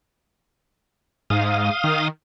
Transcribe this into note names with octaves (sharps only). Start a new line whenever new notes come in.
G#2 F5 D#6
D#3